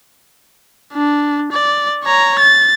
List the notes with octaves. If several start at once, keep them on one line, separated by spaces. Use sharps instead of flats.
D4
D5
C#5 A#5
A6